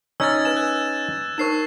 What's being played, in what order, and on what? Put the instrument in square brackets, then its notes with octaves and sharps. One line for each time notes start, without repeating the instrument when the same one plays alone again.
[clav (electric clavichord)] C#4 D#4 C#5 [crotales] E6 G#6 A6
[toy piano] B4 G#5 [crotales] E7
[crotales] F#6
[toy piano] D#4 A#4 C5 [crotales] C#6 C7 E7